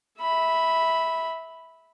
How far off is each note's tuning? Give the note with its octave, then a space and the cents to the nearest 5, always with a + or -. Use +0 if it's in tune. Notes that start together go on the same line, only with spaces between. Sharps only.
E5 -15 B5 +0